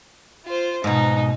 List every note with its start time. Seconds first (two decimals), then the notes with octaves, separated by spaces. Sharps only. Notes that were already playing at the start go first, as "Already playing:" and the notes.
0.46 F4 C5
0.84 G#2 B2 D#4